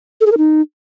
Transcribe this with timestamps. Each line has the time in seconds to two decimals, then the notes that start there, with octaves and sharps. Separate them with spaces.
0.21 A4
0.26 G#4
0.32 A#4
0.37 D#4